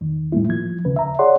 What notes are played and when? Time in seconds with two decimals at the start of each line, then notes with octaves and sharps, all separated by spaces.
0.01 E2 D#3
0.32 A2 G3 A#3 E4
0.49 F3 G#6
0.85 D#2 C#3 B4
0.96 E5 A#5
1.19 G#4 C#5 D5 F#5 C6